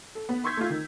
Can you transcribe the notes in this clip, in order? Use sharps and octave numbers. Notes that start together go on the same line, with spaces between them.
A4
B3
C6 C#6 E6 G6 G#6 B6
A3 F4
D#3